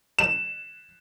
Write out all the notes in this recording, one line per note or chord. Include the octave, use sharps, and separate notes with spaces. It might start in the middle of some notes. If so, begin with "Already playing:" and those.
E7